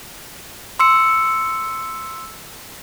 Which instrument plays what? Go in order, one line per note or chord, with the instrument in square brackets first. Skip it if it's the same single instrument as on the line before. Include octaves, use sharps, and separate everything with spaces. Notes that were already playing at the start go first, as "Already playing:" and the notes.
[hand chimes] C6 E6 C#7